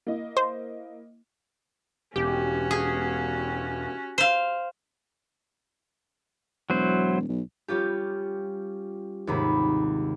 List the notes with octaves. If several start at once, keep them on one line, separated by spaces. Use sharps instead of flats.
A#3 E4 D#5
C5
E1 C#4 F#4 G4
G#4
C5 F5
E1 F#3 E4 C5
B1
G3 C#4 F4 G4
D#2 G#2 C3 B5